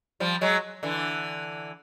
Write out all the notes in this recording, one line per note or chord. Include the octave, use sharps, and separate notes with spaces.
F3 G3
F#3 G#3
D3 E3